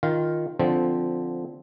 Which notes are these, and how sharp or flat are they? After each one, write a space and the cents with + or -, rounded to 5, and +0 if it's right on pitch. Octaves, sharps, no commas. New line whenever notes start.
D#3 +0 F4 +0 F5 +5
D3 +0 F3 +0 C4 -10